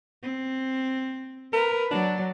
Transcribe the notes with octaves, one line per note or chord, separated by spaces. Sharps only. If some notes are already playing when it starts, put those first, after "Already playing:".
C4
A#4 B4
F#3 D4 D5